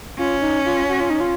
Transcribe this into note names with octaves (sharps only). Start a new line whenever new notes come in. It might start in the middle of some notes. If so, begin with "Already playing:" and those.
C#4 F4
D#4
F4
F#4
F4
D#4
F4